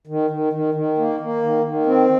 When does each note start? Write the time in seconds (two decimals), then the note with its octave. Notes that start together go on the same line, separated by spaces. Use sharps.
0.07 D#3
0.30 D#3
0.53 D#3
0.74 D#3
0.98 A#3
1.20 A#3
1.42 D#3
1.64 D#3
1.86 C4